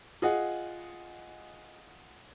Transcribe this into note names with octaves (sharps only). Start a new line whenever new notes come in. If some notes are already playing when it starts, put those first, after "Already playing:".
F4 G#4 D#5 F#5